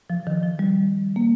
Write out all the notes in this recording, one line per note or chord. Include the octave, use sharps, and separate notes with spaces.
F3
D#3
F3
G3
A#3